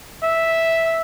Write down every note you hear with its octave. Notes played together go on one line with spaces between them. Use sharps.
E5